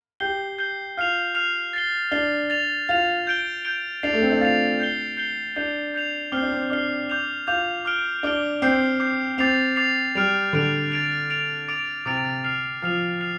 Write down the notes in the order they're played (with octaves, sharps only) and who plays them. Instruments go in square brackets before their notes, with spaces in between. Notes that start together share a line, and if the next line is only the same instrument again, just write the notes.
[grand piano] G4 [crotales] G6 C7 G7
[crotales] G6 C7 G7
[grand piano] F4 [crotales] F6 C7 F7
[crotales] F6 C7 F7
A6 C7 G7
[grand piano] D4 [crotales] A6 C7 G7
[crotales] A6 F7
[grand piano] F4 [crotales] A6 F7
[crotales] G6 D7 G7
G6 D7 G7
[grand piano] D4 [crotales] A6 C7 F7
[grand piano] A3
C4
D4
[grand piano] F4 [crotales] A6 C7 F7
[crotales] G6 C7 G7
G6 C7 G7
[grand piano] D4 [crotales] G6 C7 F7
[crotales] G6 C7 F7
[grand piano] C4 [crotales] D6 F6 C7 G7
[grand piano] D4
C4
[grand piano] D4 [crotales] D6 F6 C7 G7
[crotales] D6 G6 F7
[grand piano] F4 [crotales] D6 G6 F7
[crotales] D6 F6 D7 G7
[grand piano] D4 [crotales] D6 F6 D7 G7
[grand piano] C4 [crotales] D6 G6 C7
[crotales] D6 G6 C7
[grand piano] C4 [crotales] D6 A6 C7 F7
[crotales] D6 A6 C7 F7
[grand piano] G3 [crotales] F6 D7 F7
[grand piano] D3 [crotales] F6 D7 F7
[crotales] A6 D7 F7
A6 D7 F7
D6 A6 D7 F7
[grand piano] C3 [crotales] D6 A6 D7 F7
[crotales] F6 C7 F7
[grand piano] F3 [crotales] F6 C7 F7
[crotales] F6 C7 F7